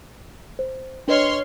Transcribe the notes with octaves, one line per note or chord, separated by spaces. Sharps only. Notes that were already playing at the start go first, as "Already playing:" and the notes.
C5
D4 B4 C#5 D#5 C6 F6